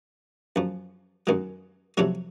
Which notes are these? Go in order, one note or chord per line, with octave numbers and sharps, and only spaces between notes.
F#2 F3
F#2 D#3 F#3
F2 C3 F#3 C#5